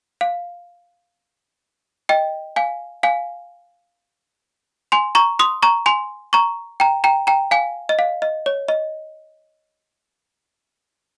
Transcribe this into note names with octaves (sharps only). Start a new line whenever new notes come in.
F5
D#5 G5
F5 G#5
F5 G#5
G#5 C6
A#5 C#6
C6 D#6
A#5 C#6
G#5 C6
A#5 C#6
G5 A#5
G5 A#5
G5 A#5
F5 G#5
D#5
F5
D#5
C#5
D#5